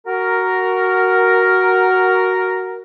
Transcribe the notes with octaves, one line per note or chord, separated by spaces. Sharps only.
F#4 A#4